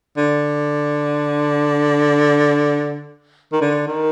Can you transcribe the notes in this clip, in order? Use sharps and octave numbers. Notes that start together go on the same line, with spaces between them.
D3
D#3
D3
D#3